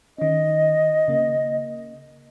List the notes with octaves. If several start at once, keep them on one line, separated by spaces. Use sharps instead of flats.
D#3 C#4 D#5
C#3 A#3